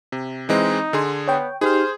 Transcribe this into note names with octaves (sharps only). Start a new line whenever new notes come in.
C3
E3 G#3 C4 D#4
D3 G#4 C6
B3 C#5 G5
D#4 G4 G#4 C5 F6